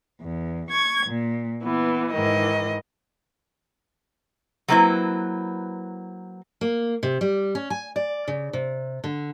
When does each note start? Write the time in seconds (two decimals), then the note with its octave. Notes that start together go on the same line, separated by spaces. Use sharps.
0.21 E2
0.71 C#6 G#6
1.07 A#2
1.62 E3 B3
2.12 G#2 D#3 E3 D#5
4.68 F#3 G3 A#3 C4 E4 B4
6.61 A#3
7.03 C3
7.21 G3
7.55 C#4
7.70 G#5
7.96 D5
8.28 C#3
8.53 C3
9.04 D3